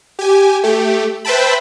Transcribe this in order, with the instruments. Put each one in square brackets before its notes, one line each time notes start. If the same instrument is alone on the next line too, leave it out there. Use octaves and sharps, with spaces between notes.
[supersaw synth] G4 G#5
A3 G4
B4 C5 E5 G5 A5 B5